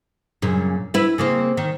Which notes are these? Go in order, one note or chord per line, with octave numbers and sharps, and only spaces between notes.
F#2 A#2 C#3
E4 B4
C#3 A#3 C4
D#3